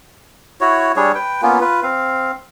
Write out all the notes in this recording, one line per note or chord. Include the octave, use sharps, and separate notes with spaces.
E4 F#4 C#5
G3 D4 G#4 C#5
B4 G5
A#3 B3 C#4 F4
F4 B4
C4 F5